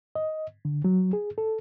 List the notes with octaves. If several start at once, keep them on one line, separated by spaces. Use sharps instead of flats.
D#5
D3
F#3
G#4
A4